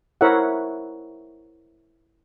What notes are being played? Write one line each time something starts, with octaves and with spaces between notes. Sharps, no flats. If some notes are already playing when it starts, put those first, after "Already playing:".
E4 A#4 C5 C#5 E5 F#5